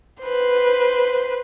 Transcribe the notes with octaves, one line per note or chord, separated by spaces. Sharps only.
B4 C5